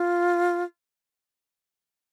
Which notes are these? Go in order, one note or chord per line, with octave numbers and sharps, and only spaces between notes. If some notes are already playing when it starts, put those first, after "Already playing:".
Already playing: F4